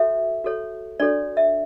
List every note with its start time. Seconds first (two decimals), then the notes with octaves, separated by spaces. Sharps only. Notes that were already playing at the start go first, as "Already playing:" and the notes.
Already playing: F#4 A4 C#5 E5
0.44 F#4 A4 C#5
1.00 D4 F#4 A4 C#5 D5
1.37 E5